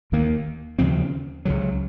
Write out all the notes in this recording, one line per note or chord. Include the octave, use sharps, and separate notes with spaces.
D#2 D#3 A#3
D#2 C#3 F3 C4
C#2 C#3 F#3